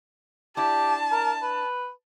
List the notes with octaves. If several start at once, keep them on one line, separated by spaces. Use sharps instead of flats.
D4 E4 G4 A5
A#4
B4